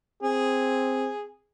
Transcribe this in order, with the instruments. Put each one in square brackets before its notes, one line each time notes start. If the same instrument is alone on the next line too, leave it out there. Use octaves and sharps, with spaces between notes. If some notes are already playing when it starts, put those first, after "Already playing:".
[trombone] C4 [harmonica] G#4